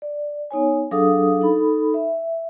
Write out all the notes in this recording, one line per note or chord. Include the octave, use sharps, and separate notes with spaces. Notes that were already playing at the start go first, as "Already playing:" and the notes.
D5
B3 D#4 C#5 G#5
F#3 D4 G#4 A4 F5 D#6
D#4 A4 B5
E5